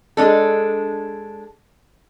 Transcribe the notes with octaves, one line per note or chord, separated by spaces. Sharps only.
G#3 D4 A4